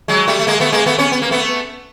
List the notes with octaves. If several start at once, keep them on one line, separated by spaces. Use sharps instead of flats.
F#3 G#3
G3 A3
A3
G#3 A#3
A3 B3
G#3 A#3
A3 B3
B3 C#4
B3
A#3
A3 B3